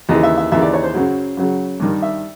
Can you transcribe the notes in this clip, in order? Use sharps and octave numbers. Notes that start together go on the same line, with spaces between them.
D#2 C#3 E3 D#5
E5
E5
D#2 C#3 E3 E5
D5
C#5
C5
F#2 C#3 F#3
F#2 C#3 F#3
G2 D#3 G3
E5